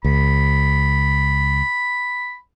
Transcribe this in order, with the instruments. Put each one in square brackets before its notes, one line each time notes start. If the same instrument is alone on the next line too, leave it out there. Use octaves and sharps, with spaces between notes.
[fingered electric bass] C#2 [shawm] B5